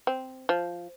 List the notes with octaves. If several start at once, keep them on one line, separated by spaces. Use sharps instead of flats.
C4
F3